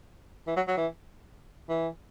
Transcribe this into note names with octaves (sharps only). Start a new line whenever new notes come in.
E3
F#3
F#3
E3
E3